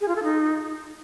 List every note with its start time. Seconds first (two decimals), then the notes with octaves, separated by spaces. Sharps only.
0.01 G#4
0.08 F4
0.16 A4
0.23 D#4